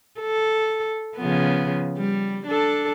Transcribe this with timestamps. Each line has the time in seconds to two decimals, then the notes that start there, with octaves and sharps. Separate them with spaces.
0.20 A4
1.17 C#3 F3 B3
1.98 G3
2.47 D4 A4